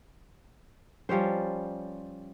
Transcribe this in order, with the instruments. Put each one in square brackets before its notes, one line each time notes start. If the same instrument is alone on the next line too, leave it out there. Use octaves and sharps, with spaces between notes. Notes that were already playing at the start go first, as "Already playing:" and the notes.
[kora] F3 G3 C#4 C5